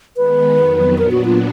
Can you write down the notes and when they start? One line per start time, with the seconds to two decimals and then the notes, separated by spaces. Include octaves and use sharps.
0.17 D#3 G#3 B3 B4
0.58 F2 D#3 F#3 B3
0.98 A#2 F#3 B3 D4 A#4
1.11 F#4
1.25 F4